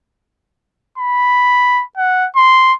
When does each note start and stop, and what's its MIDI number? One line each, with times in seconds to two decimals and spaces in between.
0.98 1.83 83
1.97 2.28 78
2.36 2.73 84